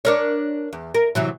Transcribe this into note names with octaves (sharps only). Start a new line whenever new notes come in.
D4 A#4 C#5
E2
A#4
C3 E3 F#3